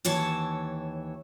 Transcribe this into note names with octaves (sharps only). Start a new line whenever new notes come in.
D#2 E3 C#5 E5 A5